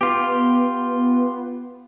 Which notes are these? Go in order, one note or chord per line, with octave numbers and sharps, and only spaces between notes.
B3 F4 G4